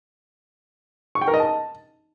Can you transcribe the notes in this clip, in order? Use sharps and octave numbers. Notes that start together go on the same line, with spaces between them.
C#6
G5
A#4
D#5
A5